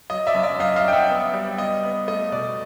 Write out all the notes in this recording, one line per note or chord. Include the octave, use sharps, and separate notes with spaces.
F#3 D#5
D5 E5
F#2
D5 E5
F#2 D#5 F5
D#5 F5
F#3 G5
E5 F#5
B3
G3
B3 D#5
B3
A3 D#5
B2 D5